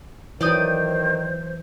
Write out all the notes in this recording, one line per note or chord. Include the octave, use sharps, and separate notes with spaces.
D#3 E3 F#3 C5 D5 G5 D#6